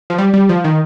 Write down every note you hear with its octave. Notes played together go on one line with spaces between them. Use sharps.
F3
G3
G3
F3
D#3